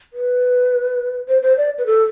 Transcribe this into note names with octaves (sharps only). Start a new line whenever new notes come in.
B4
C5
C5
D5
B4
A4